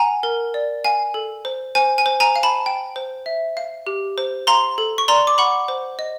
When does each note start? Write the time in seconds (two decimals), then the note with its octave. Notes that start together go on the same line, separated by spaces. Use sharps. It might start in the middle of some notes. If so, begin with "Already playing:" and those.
Already playing: F#5 G#5 A#5
0.23 A#4
0.54 D5
0.84 F5 G#5
1.14 A4
1.45 C5
1.75 C5 G#5
1.98 G#5
2.06 C5
2.20 G#5 A#5
2.36 F5
2.43 A5 B5
2.66 G5
2.96 C5
3.26 E5
3.57 F5
3.87 G4
4.18 C5
4.47 F5 A#5 C6
4.78 A4
4.98 C#6
5.08 D5 A#5 C6
5.27 D6
5.38 F#5 B5 C#6
5.68 C5
5.99 D#5